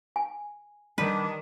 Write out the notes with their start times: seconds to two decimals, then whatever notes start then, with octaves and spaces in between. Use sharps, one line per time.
0.16 G#5
0.98 D#3 G3 D4 B4